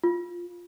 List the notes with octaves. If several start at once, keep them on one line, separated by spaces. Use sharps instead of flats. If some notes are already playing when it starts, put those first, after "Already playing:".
F4